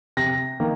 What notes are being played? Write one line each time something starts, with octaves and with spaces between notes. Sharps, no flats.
C3 A#6
D#3 A#3